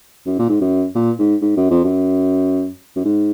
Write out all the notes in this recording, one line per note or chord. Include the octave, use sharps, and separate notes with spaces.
F#2
A#2
G#2
F#2
A#2
G#2
G#2
F#2
F2
F#2
F#2
G#2